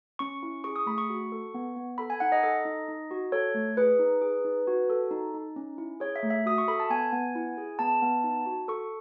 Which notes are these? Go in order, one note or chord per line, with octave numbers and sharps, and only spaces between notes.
C#4 C#6
E4
G#4 C#6
D#6
A3 B5
C#6
F#4
A4
B3
B3
A4 B5
G#5
D#4 F#5
D#5
A4 D#5
D#4
D#4
F#4
A4 C#5
A3
G#4 B4
D#4
G#4
D#4
F#4
A4
D#4
D#4
C#4
E4
G#4 C#5
E5
A3
E5
F#4 D#6
C#6
A4 B5
A5
B3 G#5
B3
E4
G#4
B3 A5
B3
D#4
F#4
A4 C#6